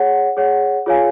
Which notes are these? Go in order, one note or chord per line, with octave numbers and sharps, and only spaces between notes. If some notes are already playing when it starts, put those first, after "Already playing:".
Already playing: G#4 C#5 F#5
G#4 C#5 F#5
F4 G#4 C#5 F5 G#5